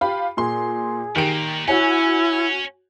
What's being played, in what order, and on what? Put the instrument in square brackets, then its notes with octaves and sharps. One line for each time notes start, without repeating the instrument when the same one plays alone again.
[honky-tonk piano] F4 G4 B5
[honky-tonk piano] A#2 C6 [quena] G#4
[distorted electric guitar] A#2 [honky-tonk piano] D#3 G4 D7
[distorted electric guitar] C#4 [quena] E4 [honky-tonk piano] F#4 C#5 G#5